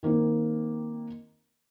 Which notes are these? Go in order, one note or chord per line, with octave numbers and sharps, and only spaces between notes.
D#3 A#3 C4 D#4